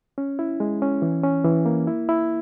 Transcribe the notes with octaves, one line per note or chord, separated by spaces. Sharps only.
C#4
E4
G#3
C#4
E3
C#4
E3
A#3
E4
E4